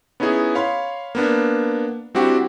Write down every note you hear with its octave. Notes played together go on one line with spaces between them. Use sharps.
B3 C#4 D#4 E4 G#4
C#5 F5 B5 C6
A#3 B3 D4
G3 C4 D4 E4 F#4 G4